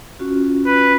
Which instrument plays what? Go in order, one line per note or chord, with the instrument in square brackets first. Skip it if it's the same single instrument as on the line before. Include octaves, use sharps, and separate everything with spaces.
[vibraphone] C#4 F4 F#4
[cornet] B4